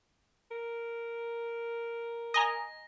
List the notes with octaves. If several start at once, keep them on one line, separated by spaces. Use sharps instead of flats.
A#4
D#5 G#5 A#5 A#6